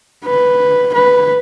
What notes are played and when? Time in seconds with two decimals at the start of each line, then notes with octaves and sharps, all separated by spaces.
0.25 B4
0.94 B4